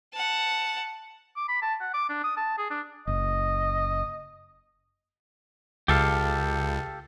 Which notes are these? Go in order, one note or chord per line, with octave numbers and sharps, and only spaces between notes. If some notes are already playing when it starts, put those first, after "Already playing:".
F#5 A5
D6
B5
A5
F#5
D6
D4
D#6
A5
G#4
D4
F#1 D#5
C#2 G4 A4 F5